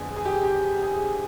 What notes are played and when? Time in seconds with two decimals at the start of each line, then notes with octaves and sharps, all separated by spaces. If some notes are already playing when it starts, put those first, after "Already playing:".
Already playing: F2 D3 G#3 B3 D4 G#4
0.16 G#4
0.25 G4
0.44 G4
0.83 G#4